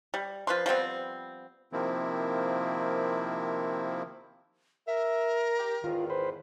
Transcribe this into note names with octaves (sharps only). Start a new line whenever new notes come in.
G3
F3 B4 C6
F3 G3 B3 C4
C3 D#3 F3 A#3 C4 E4
A#4 E5
G4
E2 G#2 D#3 F4
B4 C5